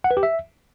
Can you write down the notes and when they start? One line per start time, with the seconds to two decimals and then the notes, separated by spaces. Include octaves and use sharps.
0.04 F#5
0.11 B4
0.17 G4
0.23 E5